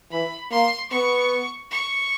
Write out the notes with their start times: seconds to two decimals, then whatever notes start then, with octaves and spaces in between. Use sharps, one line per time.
0.11 E3 B5
0.51 A#3 C6
0.91 B3 C#6
1.71 C#6